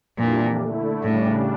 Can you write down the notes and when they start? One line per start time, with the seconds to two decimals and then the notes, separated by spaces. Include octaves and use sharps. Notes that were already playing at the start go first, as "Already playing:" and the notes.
0.19 F2 A#2 E3 G3 D4
0.61 D3 A3 E4
1.03 A2 C#3 G3 D4